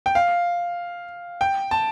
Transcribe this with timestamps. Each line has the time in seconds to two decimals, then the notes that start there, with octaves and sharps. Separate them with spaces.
0.06 G5
0.15 F5
1.41 G5
1.71 A5